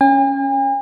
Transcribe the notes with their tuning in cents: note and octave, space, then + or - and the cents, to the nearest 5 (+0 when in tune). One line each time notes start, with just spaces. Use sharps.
C#4 +0 G#5 -45